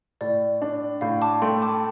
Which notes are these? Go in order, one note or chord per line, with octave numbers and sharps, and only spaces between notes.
A2 D5
D4
A2 F5
A5 D6
A3 G5 C6
A5 D6